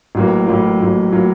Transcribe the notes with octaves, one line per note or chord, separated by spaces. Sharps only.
A1 A2 F#3 A#3
A1 A2 F#3 A#3
A1 A2 F#3 A#3
A2 F#3 A#3